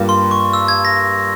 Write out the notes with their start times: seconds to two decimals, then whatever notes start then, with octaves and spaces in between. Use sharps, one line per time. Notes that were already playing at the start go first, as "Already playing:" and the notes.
Already playing: G2 G3 A#3 F4
0.09 C6
0.31 C#6
0.53 E6
0.68 G#6
0.85 A#6